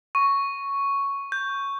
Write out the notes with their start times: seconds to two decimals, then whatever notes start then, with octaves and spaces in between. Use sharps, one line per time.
0.15 C#6
1.32 G6